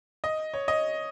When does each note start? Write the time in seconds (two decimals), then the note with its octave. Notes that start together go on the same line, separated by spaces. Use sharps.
0.24 D#5
0.54 C#5
0.68 D#5